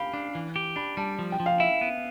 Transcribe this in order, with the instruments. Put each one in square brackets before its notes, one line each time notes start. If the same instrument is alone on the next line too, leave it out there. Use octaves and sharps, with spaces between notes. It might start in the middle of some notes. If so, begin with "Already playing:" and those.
Already playing: [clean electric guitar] G4 [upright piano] F5 B5
[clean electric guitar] D4
E3
G4
[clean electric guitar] D4 [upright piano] B5
[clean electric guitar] G3 [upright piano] A5
[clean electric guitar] F3
[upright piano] G5
[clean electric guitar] F3
[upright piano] F5
[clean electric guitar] E4 [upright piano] E5
[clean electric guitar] B3